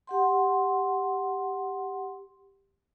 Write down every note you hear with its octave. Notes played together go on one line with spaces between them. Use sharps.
G4 F#5 C6